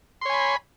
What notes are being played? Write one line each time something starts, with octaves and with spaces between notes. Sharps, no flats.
C#5 G#5 B5 C6